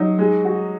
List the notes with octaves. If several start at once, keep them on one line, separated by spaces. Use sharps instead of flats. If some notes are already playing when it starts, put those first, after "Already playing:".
Already playing: F#3 D#4
G#3
F#4